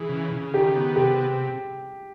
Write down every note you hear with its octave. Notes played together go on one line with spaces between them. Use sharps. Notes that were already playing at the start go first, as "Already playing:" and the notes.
Already playing: E3 G#4
C#3
C#3
D#3 G4
B3
C3 G4